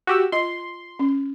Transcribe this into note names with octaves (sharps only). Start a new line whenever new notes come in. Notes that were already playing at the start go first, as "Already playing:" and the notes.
F#4 G4 E6
F4 D#5 C6
C#4